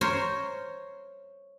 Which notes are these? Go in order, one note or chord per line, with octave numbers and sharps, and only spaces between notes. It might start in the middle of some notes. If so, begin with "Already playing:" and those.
A#4 C5 C#5